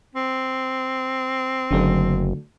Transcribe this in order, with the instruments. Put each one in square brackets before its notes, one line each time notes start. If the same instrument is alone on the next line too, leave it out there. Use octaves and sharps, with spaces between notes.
[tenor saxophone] C4
[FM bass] F#1 [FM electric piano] D3 F#3 A3